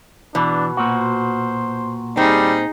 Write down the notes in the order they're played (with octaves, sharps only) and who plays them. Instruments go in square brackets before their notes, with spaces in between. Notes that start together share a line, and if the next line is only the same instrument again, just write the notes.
[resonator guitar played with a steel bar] B2 [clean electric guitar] E3 [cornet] D4
[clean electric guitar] A#2 F#4 [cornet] C5
[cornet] G3 [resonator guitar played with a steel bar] C4 [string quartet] D#4 G#4